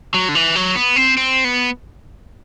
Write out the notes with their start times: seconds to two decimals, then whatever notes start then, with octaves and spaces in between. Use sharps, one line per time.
0.14 F#3
0.29 D3
0.35 E3
0.56 F#3
0.76 B3
0.96 C4
1.17 C4
1.45 B3